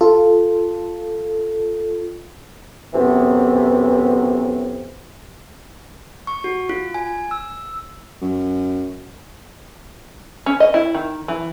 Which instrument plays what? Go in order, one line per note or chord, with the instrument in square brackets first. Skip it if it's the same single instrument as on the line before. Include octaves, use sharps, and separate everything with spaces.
[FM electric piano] F4 A4
[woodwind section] F#2 A2 C3 E3 B3
[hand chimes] C#6
F#4
F4
G#5
E6
[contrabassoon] F#2
[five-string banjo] C#4
D#5
E4
D#3
E3